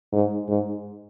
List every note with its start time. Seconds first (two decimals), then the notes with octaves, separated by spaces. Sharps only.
0.13 G#2
0.48 G#2